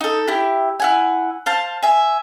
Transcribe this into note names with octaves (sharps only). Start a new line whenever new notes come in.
D#4 A4
E4 G4
E4 F#5 G#5
C5 F5 A5
E5 G#5